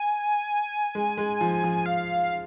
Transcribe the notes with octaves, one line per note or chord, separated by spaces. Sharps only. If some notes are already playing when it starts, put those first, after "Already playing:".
Already playing: G#5
G#3
G#3
F3
F3
F5